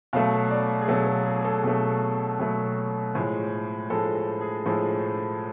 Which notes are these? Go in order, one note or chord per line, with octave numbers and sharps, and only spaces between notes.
B2 F#3 A3 F5
D5
G#4
B2 F#3 A3 A4
A4
G#4
G#4
A4
B2 F#3 A3
B2 F#3 A3
A2 F3 G#3
A2 F3 G#3 A4
A4
G#4
A2 F3 G#3 A4